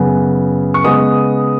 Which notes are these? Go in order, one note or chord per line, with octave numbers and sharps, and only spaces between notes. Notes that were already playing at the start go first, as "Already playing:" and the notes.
Already playing: F#2 C#3 B3
C#6
C#3 G#3 B3 D#6